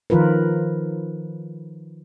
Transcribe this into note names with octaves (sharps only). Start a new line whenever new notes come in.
D#3 F3 F4 A#4 B4